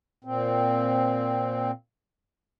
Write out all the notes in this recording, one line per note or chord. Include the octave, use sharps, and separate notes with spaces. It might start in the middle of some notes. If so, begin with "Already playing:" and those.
A#2 C4